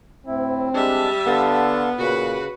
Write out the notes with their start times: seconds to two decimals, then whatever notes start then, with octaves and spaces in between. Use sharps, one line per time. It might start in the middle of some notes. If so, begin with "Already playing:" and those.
0.27 D2 A2 C4 E4
0.74 G3 G#3 D4 E5
1.26 D3 B3 A4 F5 A5
1.99 A#2 C#3 F#4 B4